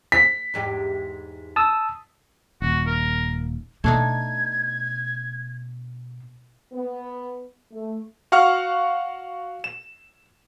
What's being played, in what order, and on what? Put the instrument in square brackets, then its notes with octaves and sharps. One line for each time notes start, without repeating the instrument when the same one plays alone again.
[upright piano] B6
[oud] E2 G#2 G4
[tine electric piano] A5 D#6 E6
[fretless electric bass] D#1 [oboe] F#4
[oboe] A#4
[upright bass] B2 [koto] A3 D4 D#4 [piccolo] G#6
[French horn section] B3
A3
[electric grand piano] F#4 F5 F#5 C#6 F6
E7